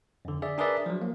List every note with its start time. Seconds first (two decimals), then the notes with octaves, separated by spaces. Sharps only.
0.25 F2 D3
0.42 G#4 D5 E5
0.58 D4 G#4 A#4 B4 D5 E5
0.86 F3 F#3
1.02 A#3